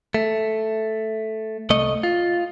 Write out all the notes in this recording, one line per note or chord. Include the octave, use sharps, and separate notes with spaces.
A3
C2 A3 D#5
F4